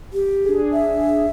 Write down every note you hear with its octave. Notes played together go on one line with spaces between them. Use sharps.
G4
D4 G#4
E5